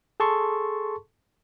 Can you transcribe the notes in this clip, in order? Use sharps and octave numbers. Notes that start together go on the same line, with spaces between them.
G#4 A4 A5 C6 C#6